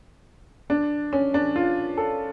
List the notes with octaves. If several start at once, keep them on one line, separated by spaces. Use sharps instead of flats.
D4
C#4
D4
F4
A4